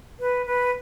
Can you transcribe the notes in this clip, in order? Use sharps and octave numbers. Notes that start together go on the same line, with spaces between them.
B4
B4